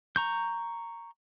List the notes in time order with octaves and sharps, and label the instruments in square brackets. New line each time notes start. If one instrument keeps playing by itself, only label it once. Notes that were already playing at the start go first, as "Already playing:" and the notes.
[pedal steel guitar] A#5 C#6 G6